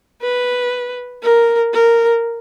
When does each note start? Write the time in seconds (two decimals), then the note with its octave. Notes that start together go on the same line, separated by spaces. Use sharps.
0.22 B4
1.23 A#4
1.73 A#4